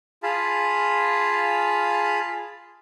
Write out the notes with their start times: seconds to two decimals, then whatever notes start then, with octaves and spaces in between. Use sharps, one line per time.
0.23 F4 G#4 F5 A5 B5